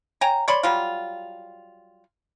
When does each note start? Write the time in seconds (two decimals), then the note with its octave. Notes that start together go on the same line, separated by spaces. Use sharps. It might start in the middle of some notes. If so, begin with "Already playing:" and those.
0.21 C#5 G5 G#5 A#5
0.48 C#5 D5 B5 C6
0.63 F#3 G3 F4